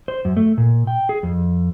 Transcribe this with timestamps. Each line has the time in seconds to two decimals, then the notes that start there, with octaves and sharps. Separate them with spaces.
0.08 C5
0.25 F#2
0.37 A3
0.58 A#2
0.87 G5
1.09 G#4
1.23 F2